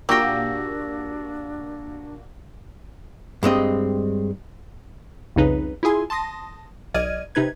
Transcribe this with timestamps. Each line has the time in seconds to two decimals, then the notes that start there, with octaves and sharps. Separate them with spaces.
0.09 A#2 A#3 D4 F#4 G4 G5 E6 A#6
3.43 G2 G#3 C4 D#5
5.36 C2 F2 C#3 D#4 B4
5.83 E4 F4 G#4 G#5 C6
6.10 A5 C6 D#6 A#6
6.94 B1 D5 D#5 F6 G#6 D#7
7.35 C3 D#4 B4 G#6